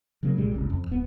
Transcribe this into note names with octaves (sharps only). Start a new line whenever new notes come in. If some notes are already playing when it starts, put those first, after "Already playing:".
C#3 F#3 A#3 C#4
C2 A#2 G3 G#3
G1 C#2 C#4
F2
D1 B3